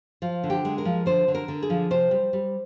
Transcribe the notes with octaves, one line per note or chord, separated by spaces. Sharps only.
F3 F4
D3
G4
G#3
A#4
F3
D3 C5
D3
A#4
D3
G#4
F3
C3 C5
G3
G3